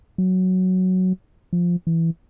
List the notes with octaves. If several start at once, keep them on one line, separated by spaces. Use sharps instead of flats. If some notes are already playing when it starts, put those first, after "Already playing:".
F#3
F3
E3